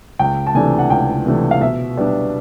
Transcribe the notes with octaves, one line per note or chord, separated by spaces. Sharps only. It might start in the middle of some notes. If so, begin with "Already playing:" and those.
C#2 G5
A5
C3 E3 A3 D4 G#5
F#5
C#2 G5
C3 E3 A3 D4
F5
B2 E5
G3 B3 D4